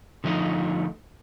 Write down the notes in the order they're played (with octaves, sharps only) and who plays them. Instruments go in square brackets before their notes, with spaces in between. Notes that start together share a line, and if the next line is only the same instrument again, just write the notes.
[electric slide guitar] D3 F3 A3 D#4